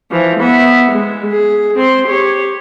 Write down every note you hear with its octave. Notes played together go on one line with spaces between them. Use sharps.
E3 F3
B3 E5
G#3
G#4
C4 C6
G4 C#5